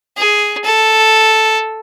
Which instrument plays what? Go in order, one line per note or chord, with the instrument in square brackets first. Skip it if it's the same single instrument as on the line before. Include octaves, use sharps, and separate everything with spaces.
[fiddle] G#4
A4